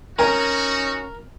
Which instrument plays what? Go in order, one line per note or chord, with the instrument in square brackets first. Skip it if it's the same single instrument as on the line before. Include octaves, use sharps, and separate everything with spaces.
[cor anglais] C#4 [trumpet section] D#4 F#4 [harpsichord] A#4 [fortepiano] C#5 G#5